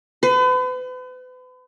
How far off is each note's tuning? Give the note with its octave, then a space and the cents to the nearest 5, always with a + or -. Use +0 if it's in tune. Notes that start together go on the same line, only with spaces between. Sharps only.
B4 +40